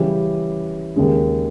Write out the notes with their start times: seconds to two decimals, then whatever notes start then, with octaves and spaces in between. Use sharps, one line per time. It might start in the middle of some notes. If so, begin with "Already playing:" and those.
Already playing: C#3 E3 G3 C#4 G4
0.96 D#2 C#3 G#3